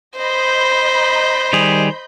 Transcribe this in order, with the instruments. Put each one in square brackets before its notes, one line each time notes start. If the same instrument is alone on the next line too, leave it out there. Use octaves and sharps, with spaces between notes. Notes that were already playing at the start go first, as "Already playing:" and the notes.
[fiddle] C5 [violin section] D#5 B5 G6
[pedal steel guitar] D#3 G3 G#4